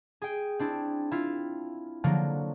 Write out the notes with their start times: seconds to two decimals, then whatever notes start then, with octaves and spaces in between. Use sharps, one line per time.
0.22 G#4 G5
0.59 C4 D4 E4
1.11 E4 F4
2.04 D3 F3 F#3 A#3